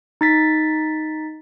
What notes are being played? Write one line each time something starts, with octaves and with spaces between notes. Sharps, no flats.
D#4 A6 B6